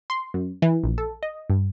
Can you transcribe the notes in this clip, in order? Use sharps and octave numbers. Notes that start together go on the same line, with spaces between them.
C6
F#2
E3
A#1
A4
D#5
G2